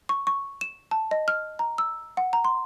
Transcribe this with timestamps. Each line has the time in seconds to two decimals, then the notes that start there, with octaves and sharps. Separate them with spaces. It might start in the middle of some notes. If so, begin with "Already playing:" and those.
0.09 C#6
0.27 C#6
0.61 E7
0.91 A5
1.11 D#5
1.28 F6
1.59 A#5
1.78 E6
2.17 F#5
2.33 A#5
2.45 C6